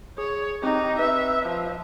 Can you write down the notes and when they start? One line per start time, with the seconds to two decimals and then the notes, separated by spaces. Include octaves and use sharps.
0.18 G#4 C#5
0.62 C4 D#4 G4
0.99 B4 E5
1.46 F3